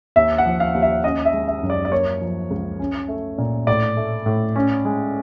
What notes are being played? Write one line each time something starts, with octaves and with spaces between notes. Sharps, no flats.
D#2 E5
F#5
F3
F5
D#2
E5
C#4 D#5
E5
G#3
E5
F#2
D5
D5
A#3 C#5
F3
C#2
C#4
A3
A#2
A2 D5
A3
A2
C#4
G#3